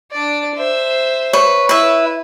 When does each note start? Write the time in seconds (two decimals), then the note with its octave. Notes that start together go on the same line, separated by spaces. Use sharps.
0.12 D4 D5
0.55 C5 E5
1.33 B4 C#5
1.69 E4 B4 E5